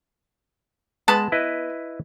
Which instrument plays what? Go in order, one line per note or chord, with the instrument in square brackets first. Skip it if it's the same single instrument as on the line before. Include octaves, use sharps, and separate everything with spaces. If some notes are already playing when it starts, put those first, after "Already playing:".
[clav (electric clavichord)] G#3 [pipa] B3 A5 B5
[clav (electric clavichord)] E4 B4 D#5